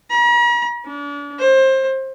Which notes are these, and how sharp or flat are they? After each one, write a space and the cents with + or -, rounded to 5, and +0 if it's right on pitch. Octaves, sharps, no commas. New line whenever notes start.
A#5 +45
D4 -35
C5 +25